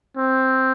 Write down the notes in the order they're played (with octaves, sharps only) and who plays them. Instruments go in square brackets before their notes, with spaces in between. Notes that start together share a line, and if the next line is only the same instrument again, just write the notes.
[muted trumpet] C4